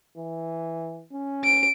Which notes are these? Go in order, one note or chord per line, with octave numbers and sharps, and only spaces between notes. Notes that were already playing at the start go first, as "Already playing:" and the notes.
E3
C#4
D7